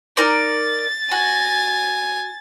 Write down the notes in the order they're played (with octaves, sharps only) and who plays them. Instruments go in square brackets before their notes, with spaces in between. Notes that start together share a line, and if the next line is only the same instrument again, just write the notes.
[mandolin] D#4 A#4 D5 [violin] A6
[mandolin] F#4 [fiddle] G#5